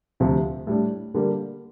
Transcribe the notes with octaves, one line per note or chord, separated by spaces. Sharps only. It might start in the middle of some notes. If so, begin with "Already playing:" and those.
D2 C3 F3
A2 G3 D4
D3 G3 A#3